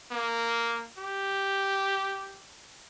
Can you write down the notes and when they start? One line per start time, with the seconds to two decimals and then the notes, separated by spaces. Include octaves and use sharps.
0.11 A#3
0.97 G4